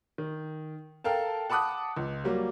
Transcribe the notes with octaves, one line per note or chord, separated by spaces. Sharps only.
D#3
A4 A#4 F5 G5 A5
F#5 A5 B5 D6 D#6 F#6
C#2
F#3 G3 A#3